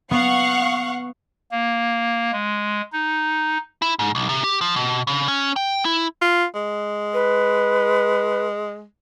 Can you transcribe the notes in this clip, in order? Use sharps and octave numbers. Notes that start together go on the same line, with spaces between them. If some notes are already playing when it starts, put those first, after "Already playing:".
B3 F5 F#5 C#6
A#3
G#3
D#4
E4
G#2
B1
C3
G4
F3
B2
C#3
C#4
G5
E4
F4
G#3
B4